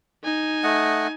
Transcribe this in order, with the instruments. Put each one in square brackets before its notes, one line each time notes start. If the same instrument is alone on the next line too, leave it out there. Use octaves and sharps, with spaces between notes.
[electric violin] D#4 G#5
[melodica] A3 D#5 F#5